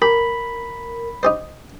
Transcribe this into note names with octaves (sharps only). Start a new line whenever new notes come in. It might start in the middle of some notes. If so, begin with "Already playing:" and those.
G4 A#4 B5
D#4 G4 C5